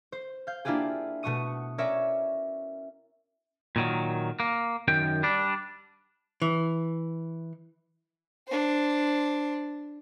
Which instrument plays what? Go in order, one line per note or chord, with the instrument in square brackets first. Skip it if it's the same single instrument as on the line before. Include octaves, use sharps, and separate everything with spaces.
[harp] C5
F5 G6
A#3 D4 E4 F4 G4 G#4
B2 A3 F#4 C#6 D#6 D#7
C#4 A#4 C#5 D5 E5
[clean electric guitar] A#2 D#3 F#3
A#3
F#2 D#3 G5
G3 D4
[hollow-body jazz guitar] E3
[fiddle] D4 C5